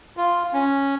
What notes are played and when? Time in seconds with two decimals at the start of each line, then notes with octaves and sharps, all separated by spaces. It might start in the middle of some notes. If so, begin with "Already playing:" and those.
0.17 F4
0.53 C#4